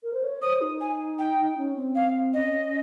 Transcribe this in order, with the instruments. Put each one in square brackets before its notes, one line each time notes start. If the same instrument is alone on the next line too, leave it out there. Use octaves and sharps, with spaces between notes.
[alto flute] A#4
C5
C#5
[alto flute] C5 [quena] D#6
[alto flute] D#4
[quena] G#5
G5
[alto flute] C#4
C4
[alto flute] C4 [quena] F5
[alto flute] C#4 [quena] D#5